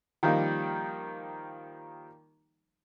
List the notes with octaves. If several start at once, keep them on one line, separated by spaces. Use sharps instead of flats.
D#3 F3 G3 A#3 D#4